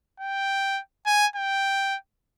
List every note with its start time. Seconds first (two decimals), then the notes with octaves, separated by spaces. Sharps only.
0.20 G5
1.06 G#5
1.36 G5